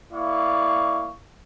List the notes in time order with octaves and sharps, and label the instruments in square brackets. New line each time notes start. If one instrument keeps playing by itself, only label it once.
[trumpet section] A#3 E4 D5 F5 C#6